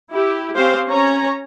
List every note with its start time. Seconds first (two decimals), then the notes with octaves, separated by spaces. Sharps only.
0.11 E4 G4
0.54 C4 C#4 G4 C5 F5
0.87 C#4 C#5 A#5